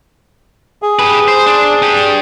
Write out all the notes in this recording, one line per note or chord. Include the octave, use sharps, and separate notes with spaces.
G#4
G4 B4
C5
D4
D4 G4